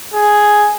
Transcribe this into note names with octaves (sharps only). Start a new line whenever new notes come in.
G#4